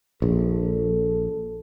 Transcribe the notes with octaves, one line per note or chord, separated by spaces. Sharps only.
A#1 A4